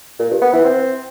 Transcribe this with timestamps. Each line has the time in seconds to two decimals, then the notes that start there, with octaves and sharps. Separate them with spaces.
0.19 A#2
0.30 G2
0.42 B3
0.53 E3
0.64 C4